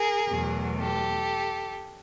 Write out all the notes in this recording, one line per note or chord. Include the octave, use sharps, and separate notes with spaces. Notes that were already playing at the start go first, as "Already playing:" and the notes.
Already playing: G#4 A#4
E2 B2 F#3 A3
G4 A4